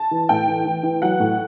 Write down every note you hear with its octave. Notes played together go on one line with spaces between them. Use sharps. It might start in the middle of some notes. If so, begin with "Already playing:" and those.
Already playing: A5
E3
A2 G5
E3
E3
E3
F#3 F#5
A2